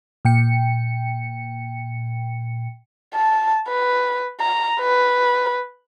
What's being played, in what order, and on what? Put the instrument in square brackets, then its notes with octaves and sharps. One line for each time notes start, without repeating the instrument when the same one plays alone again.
[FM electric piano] A#2 G5 C#7
[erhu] A5
B4
A#5
B4